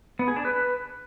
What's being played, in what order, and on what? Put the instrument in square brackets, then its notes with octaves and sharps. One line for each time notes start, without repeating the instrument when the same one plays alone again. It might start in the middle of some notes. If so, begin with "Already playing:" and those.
[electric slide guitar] B3
G#4
D4
B4